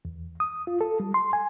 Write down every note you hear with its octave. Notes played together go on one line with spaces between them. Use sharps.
E2
D#6
F4
A4
G3
C6
G#5